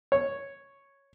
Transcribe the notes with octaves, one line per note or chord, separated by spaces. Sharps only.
C#5